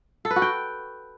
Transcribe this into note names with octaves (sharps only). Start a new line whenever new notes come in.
A4
B4
F#4
G5